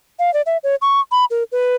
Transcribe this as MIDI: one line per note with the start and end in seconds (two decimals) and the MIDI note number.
0.19 0.33 77
0.34 0.42 74
0.46 0.57 76
0.63 0.75 73
0.82 1.00 85
1.12 1.25 83
1.31 1.43 70
1.52 1.76 71